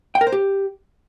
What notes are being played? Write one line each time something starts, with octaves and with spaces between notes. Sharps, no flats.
G5
A#4
C5
G4